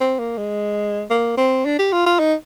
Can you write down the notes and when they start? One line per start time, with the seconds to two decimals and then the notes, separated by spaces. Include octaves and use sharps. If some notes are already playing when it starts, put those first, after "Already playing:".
0.01 C4
0.19 A#3
0.37 G#3
1.10 A#3
1.37 C4
1.65 D4
1.79 G4
1.92 F4
2.06 F4
2.19 D#4